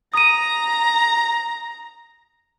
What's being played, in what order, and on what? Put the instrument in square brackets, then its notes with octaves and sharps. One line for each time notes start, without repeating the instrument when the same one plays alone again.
[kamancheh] A#5 [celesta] D#6 D#7